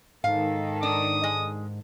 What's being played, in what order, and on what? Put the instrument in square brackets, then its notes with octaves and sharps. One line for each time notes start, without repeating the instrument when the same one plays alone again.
[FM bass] G#2 [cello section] D#3 A4 [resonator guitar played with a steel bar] F5
[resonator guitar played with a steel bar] D4 [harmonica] D#6
[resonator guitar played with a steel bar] G#3